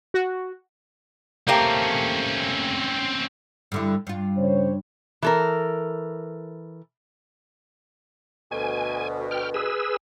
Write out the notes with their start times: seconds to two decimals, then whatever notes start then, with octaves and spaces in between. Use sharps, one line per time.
0.14 F#4
1.48 A3 A#3 C4 C#4 G4
3.72 G2 D3 E4
4.07 G2 F4
4.37 C#3 C5 C#5
5.22 E3 A4 A#4
8.51 D2 B2 G#5
9.31 G5 F6
9.54 G#4 B4 E6